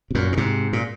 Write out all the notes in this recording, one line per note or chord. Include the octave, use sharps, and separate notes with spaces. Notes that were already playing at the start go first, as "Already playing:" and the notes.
C3
F#2 A#2
A#2
G#2 C3
A#2